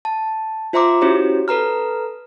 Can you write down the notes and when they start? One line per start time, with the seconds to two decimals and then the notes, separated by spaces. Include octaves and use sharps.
0.05 A5
0.73 F4 C5 E5 A#5 C6 D6
1.01 C#4 E4 F#4 G4 C5 C#5
1.48 A4 B4 A#5 F6